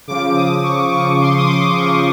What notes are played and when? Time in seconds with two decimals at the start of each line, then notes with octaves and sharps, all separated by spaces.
0.08 C#3 F3 D6
0.36 D#6
0.63 C#6
0.92 C#3 F3 C#6
1.21 C6
1.38 D#6
1.48 D6
1.77 C#3 F3 C#6